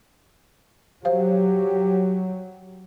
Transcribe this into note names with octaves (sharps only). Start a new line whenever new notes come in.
F#3 G4 C5 F5